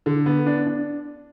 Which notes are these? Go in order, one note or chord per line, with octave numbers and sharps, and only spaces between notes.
D3
B3
D4
D4